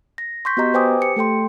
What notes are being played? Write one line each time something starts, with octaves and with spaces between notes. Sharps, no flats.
A#6
C6 C#6 G6 B6
B3 F#4 G4 D#5 A#5
B4 C5 G5 G#5 D6 D#6
G4 C#7
A3 A4 G5 C6